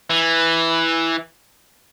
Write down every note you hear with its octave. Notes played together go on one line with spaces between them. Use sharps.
E3